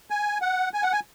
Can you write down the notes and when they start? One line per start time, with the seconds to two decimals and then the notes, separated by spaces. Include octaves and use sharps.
0.10 G#5
0.42 F#5
0.74 G#5
0.83 F#5
0.93 G#5